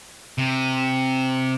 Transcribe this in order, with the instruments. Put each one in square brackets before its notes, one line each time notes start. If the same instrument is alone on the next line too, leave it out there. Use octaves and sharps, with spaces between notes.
[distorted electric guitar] C3